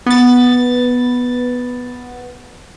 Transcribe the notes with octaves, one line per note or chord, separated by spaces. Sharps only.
B3 A6